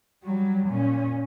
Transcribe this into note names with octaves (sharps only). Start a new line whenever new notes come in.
F#3 G3
A#2 C#4